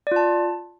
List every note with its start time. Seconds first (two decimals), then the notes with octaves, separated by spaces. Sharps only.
0.07 D5
0.12 F4
0.16 A5